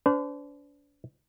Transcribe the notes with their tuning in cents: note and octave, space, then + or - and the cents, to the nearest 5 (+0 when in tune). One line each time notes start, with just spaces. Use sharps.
D4 -35 C5 -45